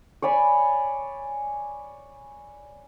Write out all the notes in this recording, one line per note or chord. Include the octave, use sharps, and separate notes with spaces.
C#5 D5 G#5 B5